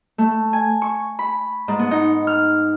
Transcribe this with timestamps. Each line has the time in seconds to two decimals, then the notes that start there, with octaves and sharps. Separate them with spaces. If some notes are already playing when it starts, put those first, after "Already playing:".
0.18 A3
0.53 G#5
0.82 C#6
1.19 B5
1.68 G#2
1.79 B3
1.91 D#4
2.27 F6